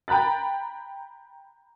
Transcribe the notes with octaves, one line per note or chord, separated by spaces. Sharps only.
G5 A#5 B5 F#6 A6